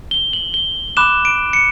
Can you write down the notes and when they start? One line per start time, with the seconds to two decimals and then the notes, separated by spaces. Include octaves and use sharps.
0.11 G7
0.33 F#7
0.54 G7
0.97 B5 D6 F#6 E7
1.25 D7
1.53 C#7